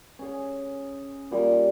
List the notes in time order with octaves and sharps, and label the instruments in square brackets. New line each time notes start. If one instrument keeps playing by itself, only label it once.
[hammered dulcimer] C#4 G#4
[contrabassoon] A#2 [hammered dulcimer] G3